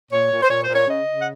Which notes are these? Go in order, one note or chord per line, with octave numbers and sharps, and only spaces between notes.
A#2 C#5
A#2
C5
A#2 C#5
C5
A#2
C#5
C#3 D#5
C#3
F#5